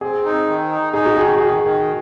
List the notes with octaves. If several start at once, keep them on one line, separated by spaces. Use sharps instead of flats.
C4 G#4
D#4
D#3
D#4
D#4 G#4
F#4
D#3 G#4
F#4
D#3 G#4
D#3